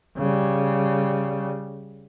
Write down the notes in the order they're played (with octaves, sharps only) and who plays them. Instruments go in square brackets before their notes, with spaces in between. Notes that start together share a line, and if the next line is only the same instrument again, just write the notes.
[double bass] C#3 G3